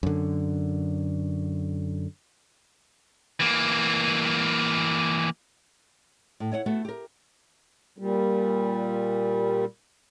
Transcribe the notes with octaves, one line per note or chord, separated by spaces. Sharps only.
F#2 D3
E3 A#3
A2
E4 C#5 D#5 F#5
A3 B3 F#4
G4 A#4
A#2 G3